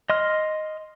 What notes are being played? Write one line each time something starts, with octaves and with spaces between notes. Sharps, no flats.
D#5 C6 F6